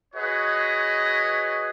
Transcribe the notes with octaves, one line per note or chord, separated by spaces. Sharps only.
F#4 G#4 B4 C#5 D#5